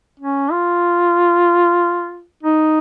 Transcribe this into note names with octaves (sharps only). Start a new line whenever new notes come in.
C#4
F4
D#4